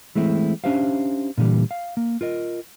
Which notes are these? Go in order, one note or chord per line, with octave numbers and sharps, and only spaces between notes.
E3 G#3 A3 C4 E4
C#4 D4 G4 C5 E5 F5
A#2 D3 E3 G3
F5
A#3
F4 A#4 D#5